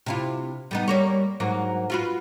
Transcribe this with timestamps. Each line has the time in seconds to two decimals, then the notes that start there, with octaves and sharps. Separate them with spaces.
0.06 C3 E4 F4
0.71 G3 B3 D#4
0.88 G3 A#3 C#5
1.40 G#2 F#3 A#3
1.90 F4 F#4 B4